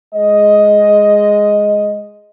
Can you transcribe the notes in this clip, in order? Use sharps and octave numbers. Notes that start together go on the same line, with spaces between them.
G#3 D#5